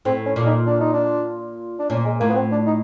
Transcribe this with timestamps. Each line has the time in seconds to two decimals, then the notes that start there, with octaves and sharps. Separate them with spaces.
0.05 A2 C4
0.26 C#4
0.36 A#2
0.42 D4
0.46 D#4
0.66 D4
0.80 D#4
0.94 D4
1.79 D4
1.90 A#2 C#4
2.05 G#3
2.20 A2 A#3
2.30 B3
2.35 C4
2.51 D4
2.66 D#4